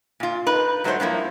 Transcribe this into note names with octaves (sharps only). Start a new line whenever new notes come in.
A#2 F4
D#4 B4
G#2 F#3 A3 C4 C5 C#5
G2 F3 A#3 E4